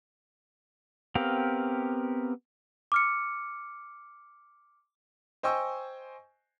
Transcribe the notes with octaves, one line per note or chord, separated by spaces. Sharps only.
B3 C4 G4 A#4 F5
D6 F6 C#7
C5 D#5 G5 G#5 C#6 E6